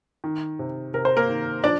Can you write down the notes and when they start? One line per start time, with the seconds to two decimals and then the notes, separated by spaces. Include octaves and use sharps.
0.24 D#3
0.59 C3
0.94 C3 A#4
1.05 C5
1.16 A#3 A#4
1.29 D#3
1.64 F3 D4 D5